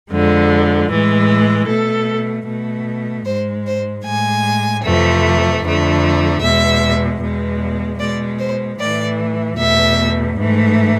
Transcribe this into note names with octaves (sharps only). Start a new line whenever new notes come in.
F2 D3 G#3
A2 E3 G#3
B2 A3 A4
B2 A3
G#2 G#3 C5
C5
A2 G#3 G#5
F2 C3 E3 A3
F2 D3 A3
E2 B2 G#3 E5
E2 B2 G#3
B2 G#3 D5
C5
A2 E3 A3 D5
E2 B2 A3 E5
G#2 E3 A3